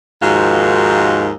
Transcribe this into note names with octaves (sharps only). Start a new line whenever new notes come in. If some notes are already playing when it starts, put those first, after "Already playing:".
D#2 G#2 D#3 F3 F4 F#4